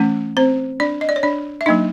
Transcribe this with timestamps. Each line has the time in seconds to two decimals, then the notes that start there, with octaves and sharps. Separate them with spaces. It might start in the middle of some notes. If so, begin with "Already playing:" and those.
Already playing: E3 A3 C#4
0.37 C4 C5
0.80 D4 D5
1.01 D#5
1.09 D5
1.16 C#5
1.23 D4 D5
1.61 E5
1.66 F#3 A#3 D4 D#4 D#5